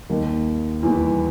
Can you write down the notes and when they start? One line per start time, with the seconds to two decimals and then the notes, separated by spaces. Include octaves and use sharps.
0.09 D#2 D#3
0.83 E2 E3